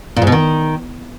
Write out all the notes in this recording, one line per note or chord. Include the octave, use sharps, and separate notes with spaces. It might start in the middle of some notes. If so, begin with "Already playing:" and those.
A#2
G#2
B2
D#3